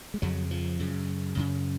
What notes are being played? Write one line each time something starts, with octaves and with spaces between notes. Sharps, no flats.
G#3
F2 C#3 F#3
F3
F#2 C#3
F#2 C#3